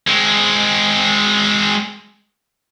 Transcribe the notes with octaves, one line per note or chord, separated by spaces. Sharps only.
G#3 C4